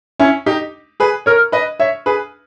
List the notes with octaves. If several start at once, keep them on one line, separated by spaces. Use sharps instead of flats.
C#4 E4
D#4 G4
G#4 B4
A#4 C#5
B4 D#5
C#5 E5
G#4 B4